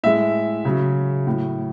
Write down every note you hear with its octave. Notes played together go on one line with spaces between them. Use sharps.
A2 G#3 E5
C#3 F#3
A2 F#3